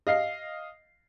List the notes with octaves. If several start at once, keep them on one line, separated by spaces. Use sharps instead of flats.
D#5 F5 C7